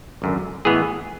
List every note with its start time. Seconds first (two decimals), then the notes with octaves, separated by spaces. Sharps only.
0.22 G#1 F#2 D3
0.65 A2 E3 G#3 B3 G#4